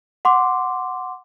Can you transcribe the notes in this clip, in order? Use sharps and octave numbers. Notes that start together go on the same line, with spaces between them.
F#5 C6 D6